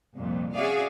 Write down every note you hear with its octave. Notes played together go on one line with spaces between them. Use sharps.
C2 F2 A#2
C#4 F#4 G#4 D5 E5 F5